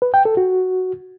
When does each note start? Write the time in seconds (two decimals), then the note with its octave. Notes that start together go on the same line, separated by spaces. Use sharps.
0.02 B4
0.14 G5
0.25 A4
0.37 F#4